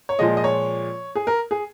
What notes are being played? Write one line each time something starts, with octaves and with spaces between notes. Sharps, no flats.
C#5
A#2 F3 G#3 D#5
D#5
C#5
G#4
A#4
G#4